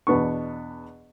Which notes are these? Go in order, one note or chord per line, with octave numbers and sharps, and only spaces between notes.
E2 B2 B3 D4 C#6